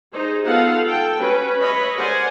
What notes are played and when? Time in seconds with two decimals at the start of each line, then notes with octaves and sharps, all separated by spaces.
0.13 D#4 G#4 C5
0.45 B3 D#4 F4 A4 F5 F#5
0.84 A4 G5
1.18 C#4 F#4 B4
1.60 B4 C#5 D#5 E5 B5
1.96 A#4 C5 D5 F#5 G#5